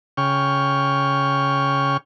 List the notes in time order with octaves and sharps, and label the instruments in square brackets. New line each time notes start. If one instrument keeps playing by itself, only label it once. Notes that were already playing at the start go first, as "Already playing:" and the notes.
[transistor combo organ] C#3 G5 C#6 F6